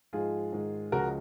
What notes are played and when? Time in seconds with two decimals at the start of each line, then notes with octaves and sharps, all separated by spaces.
0.13 G#2 F3 G#3 F4 G#4
0.53 G#2 D#3 G#3
0.92 C#2 C#3 F3 G#3 F#4 A#4